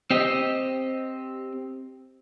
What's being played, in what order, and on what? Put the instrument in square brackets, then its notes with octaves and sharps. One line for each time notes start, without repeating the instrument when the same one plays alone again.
[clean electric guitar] C4 G4 D#5